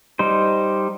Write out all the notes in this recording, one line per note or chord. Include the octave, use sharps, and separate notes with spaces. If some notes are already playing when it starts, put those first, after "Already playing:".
G3 D#4 C5